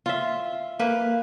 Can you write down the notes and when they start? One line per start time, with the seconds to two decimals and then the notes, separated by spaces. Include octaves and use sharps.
0.06 F4 E5
0.79 A#3 B4